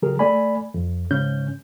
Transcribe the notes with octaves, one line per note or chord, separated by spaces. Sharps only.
C#3 F#3 G4 G#4 A#4
A3 D5 G#5 B5
F2
G#2 C#3 C#4 G6